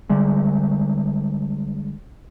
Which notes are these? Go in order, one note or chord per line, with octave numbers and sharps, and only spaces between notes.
D3 G3 G#3